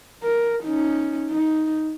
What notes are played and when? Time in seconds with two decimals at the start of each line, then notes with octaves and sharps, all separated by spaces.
0.23 A#4
0.64 C#4 D#4
1.30 D#4